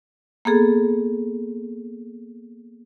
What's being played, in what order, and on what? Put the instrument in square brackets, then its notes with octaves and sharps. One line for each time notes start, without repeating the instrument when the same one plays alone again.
[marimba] A#3 B3 G#4 A4